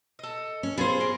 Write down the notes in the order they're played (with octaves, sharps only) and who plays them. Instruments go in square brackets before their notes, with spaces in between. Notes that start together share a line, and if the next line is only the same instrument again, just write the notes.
[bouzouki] A4 D#5
[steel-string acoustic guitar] C#4
[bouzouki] B3 F4 G#5 [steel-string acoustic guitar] G#4 C5
[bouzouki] A#4